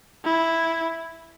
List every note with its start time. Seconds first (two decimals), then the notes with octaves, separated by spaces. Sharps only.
0.25 E4